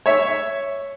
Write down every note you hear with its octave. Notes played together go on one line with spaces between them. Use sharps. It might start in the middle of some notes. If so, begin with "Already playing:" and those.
C#5 E5